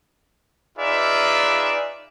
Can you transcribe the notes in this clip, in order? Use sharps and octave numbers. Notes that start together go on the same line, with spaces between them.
D#4 F4 G#4 B4 D5 E5